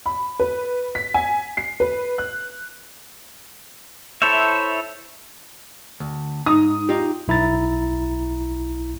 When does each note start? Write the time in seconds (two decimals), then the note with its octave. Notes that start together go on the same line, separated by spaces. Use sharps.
0.06 B5
0.40 B4
0.95 B6
1.14 G#5
1.57 C7
1.80 B4
2.18 F#6
4.22 E4 A4 C5 C#5 E5
6.00 D2
6.46 G#2 D#4 D#6
6.89 D#4 F4 G4
7.28 B1 E4 A#5 A6